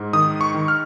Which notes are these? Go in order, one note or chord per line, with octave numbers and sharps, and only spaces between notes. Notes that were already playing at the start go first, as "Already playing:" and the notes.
Already playing: G#2
D#3 D#6
C#6
D#3
F6